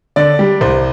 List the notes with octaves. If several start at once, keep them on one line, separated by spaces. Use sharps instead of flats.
D3 D5
G3
C2 C5